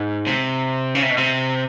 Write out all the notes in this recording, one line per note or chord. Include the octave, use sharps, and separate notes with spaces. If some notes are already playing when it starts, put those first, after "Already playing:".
Already playing: G#2
C3
C#3
C3
B2
C3